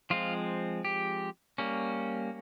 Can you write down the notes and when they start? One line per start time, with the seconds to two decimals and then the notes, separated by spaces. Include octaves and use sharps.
0.10 F3 G#3 C4 F4
0.85 G4
1.58 G3 A#3 C#4